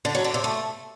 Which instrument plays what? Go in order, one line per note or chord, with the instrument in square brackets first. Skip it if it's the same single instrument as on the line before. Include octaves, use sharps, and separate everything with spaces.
[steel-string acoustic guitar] D3
F#3
D3
C3
A3